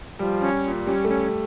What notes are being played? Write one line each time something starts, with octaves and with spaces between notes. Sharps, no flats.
F3 G3
C#4
A#2
G3 C#4
A3
C#4